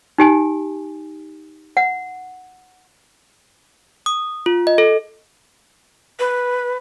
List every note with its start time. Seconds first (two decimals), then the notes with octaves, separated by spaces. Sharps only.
0.18 D#4 G4 G#5
1.77 F#5
4.06 D#6
4.46 F4
4.67 D#5
4.78 A4
6.19 B4